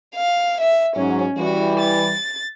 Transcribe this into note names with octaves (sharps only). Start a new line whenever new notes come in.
F5
E5
G#2 F#3 C#4
E3 G3 F#4
A6